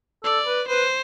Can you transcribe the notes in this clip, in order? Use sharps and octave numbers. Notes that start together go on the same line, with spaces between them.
A4 D5
B4
B4 C5